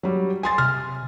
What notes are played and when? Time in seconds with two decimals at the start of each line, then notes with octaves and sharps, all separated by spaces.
0.03 F#3 G3
0.43 G#5 C6 A6
0.58 C3 F6